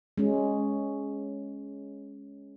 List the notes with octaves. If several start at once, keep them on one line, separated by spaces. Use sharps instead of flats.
G#3 C#4